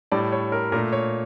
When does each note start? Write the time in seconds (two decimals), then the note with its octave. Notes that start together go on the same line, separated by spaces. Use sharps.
0.12 A2 G3 D5
0.32 C#5
0.52 A#4
0.72 A#2 A#4
0.76 A3
0.92 C#5